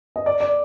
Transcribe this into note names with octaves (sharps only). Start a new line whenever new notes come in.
D#5
D5
D5